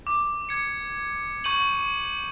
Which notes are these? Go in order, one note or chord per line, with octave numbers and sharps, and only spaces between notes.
D6
D6 G#6 C#7
C#6 G6 D#7 F#7